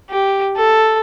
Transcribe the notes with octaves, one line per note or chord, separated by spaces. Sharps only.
G4
A4